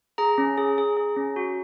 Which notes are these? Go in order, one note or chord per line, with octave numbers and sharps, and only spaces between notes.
G#4 A#5
C#4
G#4
G#4
G#4
C#4
F#4